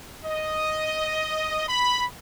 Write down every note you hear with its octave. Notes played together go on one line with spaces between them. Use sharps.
D#5
B5